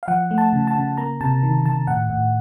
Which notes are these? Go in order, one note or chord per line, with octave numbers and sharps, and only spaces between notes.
F5
F3 F#5
A3
A5
C#3
A5
C#3
A#3 A#5
C3 A5
D#3
D#3 A5
A2 F#5
A2